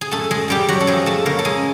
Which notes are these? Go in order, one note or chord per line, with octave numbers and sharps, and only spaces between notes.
G#4
F#2 A3 A4
G#3 G#4
F#2 G3 G4
F#3 F#4
A4
F3 G#3 G#4
A3 A4
C#3 A#3 A#4
A4
G#3 G#4